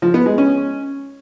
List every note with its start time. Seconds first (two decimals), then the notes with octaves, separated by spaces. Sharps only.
0.02 F3
0.14 B3
0.26 G#3
0.38 C#4